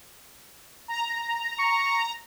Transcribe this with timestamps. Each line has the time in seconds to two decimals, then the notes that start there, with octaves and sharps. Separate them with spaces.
0.88 A#5
1.59 C#6